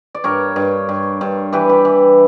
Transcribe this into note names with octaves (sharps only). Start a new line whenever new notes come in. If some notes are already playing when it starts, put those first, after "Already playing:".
D5
G2 A#4 C#5
G2
G2
G2
E3 G4 B4
G4 B4
E3